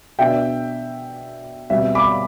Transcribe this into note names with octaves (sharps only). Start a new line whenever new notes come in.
B2 B3 D4 E5 G5
B2 G3 C4 E5
B5 D6